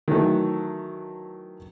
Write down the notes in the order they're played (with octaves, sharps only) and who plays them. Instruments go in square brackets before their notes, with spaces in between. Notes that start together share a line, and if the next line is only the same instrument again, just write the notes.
[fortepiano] D#3 E3 F#3 A3